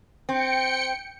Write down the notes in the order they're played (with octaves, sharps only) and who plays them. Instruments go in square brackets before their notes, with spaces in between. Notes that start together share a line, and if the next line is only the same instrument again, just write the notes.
[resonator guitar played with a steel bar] C4 [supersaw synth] G5 C#7